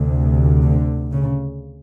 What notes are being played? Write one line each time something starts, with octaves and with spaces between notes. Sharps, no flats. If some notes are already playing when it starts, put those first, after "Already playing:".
Already playing: D2 C3
D3
C#3